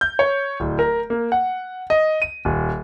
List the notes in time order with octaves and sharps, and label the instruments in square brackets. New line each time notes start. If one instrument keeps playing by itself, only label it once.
[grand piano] G6
C#5
D1
A#4
A#3
F#5
D#5
D#7
D#1